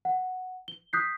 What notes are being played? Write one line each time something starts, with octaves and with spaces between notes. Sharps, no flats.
F#5
G7
D#6 F#6 G6 B6 C7